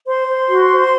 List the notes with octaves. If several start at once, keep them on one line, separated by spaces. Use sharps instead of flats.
C5 C6
C5
F#4
C5